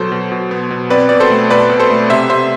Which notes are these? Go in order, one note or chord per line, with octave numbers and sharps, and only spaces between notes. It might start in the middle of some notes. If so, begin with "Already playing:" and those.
Already playing: B2 F#3 A4 C5
B2
B2
B3
B2
C4 B4 D5
B2 D5
A4 C5
A3
B2 B4 D5
B2
A4 C5
A3
C3 C5 E5
C3 C5 E5